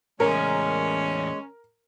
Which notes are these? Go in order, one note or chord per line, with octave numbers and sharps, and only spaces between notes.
E2 A2 G#3 C#4 A#4